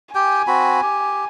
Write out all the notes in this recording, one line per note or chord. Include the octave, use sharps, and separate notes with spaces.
G4 G5 G#5
C4 F#4 B5
G4